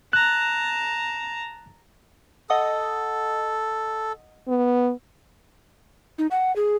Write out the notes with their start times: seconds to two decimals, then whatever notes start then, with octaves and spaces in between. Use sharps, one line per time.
0.13 A5 A#5 F#6
2.50 A4 D#5 F#5 D#6
4.48 B3
6.18 D#4
6.31 F#5
6.56 G#4